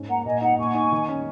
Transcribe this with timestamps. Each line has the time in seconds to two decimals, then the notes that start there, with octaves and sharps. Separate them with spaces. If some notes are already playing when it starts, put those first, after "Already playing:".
Already playing: G#2 C#4
0.08 A#3 F#5 A#5
0.25 A#2 D#5 G#5
0.41 D#4 F#5 A#5
0.58 A#2 G#5 C#6
0.75 D#4
0.92 D#3
1.08 C#4